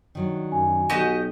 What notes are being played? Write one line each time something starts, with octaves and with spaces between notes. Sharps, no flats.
D#3 F#3 D4
F#2 G#5
B1 F#4 G4 D#5